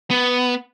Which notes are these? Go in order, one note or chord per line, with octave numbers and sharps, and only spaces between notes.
B3